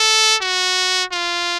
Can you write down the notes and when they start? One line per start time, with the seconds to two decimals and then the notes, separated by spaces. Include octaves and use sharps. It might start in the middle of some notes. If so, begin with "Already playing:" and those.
Already playing: A4
0.42 F#4
1.12 F4